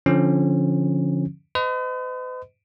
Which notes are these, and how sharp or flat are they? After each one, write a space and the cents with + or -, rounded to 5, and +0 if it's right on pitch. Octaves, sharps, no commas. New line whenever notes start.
D3 -20 F3 -5 C#4 -30
B4 +45 D#5 +0